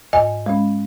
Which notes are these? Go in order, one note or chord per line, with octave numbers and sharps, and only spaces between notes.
G#2 D#5 G#5
G#3 C#4